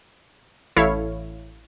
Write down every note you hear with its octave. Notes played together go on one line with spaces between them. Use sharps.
A1 E4 A4 C#5 F5